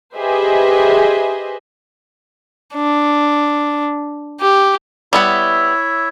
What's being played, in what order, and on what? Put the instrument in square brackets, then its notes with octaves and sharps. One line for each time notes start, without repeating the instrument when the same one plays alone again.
[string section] G4 G#4 B4 C5 D#5 E5
[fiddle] D4
G4
[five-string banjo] G3 B3 F#5 [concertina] E4 C#5 E5